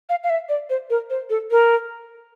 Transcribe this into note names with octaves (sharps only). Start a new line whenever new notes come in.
F5
F5
E5
D5
C5
A#4
C5
A4
A#4